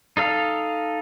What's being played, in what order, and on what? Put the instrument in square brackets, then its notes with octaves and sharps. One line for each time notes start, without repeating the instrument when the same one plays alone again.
[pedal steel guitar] D#4 A4 F5